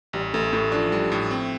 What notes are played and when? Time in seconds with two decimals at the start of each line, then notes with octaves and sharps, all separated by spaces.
0.13 A1 G3
0.33 A1 A3
0.53 A2 A3
0.72 F3 D4
0.92 G3
1.12 A2
1.31 C4